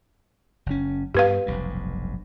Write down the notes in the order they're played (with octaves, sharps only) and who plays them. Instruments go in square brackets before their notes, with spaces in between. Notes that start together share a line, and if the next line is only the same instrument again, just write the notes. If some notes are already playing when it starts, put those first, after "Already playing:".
[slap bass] F#1 C#4
[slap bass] G2 B3 [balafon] G4 B4 F5
[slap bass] F1 B1 G2